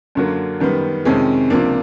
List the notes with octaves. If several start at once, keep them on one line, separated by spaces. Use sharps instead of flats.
F#2 D3 F#3 A#3
F#2 D#3 G3 B3
F2 C3 D#3 G#3 C#4
C#2 C3 F3 A#3 D4